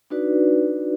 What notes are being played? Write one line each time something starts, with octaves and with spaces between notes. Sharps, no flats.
D4 D#4 F#4 B4 D5